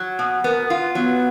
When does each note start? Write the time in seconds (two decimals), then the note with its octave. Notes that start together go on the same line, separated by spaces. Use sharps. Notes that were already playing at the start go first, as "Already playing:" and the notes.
Already playing: F#3
0.19 B2
0.44 B3 A#4
0.70 F4
0.95 F#3 B3